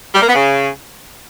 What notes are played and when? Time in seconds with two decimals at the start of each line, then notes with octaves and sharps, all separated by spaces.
0.15 G3
0.21 A#3
0.28 B3
0.35 C#3